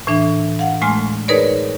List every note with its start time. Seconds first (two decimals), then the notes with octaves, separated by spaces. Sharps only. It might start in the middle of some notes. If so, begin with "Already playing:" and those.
0.07 A2 E3 D4 E5
0.59 F5 F#5
0.82 A2 G#3 A3 G#5 C6 F6
1.28 D#4 G#4 A#4 B4 C#5 D5